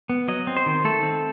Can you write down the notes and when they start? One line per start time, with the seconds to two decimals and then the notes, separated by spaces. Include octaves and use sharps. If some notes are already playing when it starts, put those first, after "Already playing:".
0.09 B3
0.28 F#3 D#5
0.47 C4
0.57 C5
0.66 D#3
0.85 A3 A4
1.03 C4